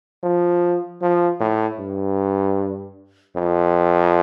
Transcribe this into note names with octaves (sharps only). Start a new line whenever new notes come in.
F3
F3
A2
G2
F2